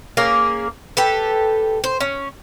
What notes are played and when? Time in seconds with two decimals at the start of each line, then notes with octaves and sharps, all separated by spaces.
0.17 A#3 C#4 G#4 A#4
0.97 G4 A4 B4
1.84 C5
2.00 C#4